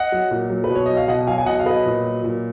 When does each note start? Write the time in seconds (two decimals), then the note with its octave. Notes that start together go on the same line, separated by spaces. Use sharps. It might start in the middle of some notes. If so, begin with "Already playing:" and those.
Already playing: D#5 F#5
0.12 F#3
0.31 A#2
0.50 F#3
0.64 B4
0.70 B2
0.75 C#5
0.86 F#3 D#5
0.97 F5
1.08 B2 D#5 F#5
1.27 F#3 F5 G#5
1.38 G#5
1.46 B2 D#5 F#5
1.60 F5
1.66 F#3 B4 D#5
1.86 A#2
2.04 F#3
2.24 A#2